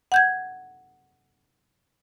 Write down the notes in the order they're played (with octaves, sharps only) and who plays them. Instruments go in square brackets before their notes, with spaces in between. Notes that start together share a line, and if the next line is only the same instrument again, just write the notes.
[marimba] F#5 G6 G#6